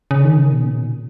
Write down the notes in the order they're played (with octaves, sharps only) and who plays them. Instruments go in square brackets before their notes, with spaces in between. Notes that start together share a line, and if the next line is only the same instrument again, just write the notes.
[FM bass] C#3
D#3
C#3
B2
A#2